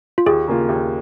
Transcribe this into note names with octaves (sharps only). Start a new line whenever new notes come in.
F4
D#2 G#4
C#3 A#3 F4
D#2